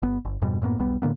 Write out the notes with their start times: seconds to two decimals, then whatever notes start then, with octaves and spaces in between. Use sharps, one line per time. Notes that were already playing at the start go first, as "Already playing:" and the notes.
0.02 G1 B3
0.25 G1
0.42 F2 G#2 B2 G3
0.62 F#2 A2 A#3 B3
0.78 E1 B1 G3 B3
1.02 A2 D3 A#3 B3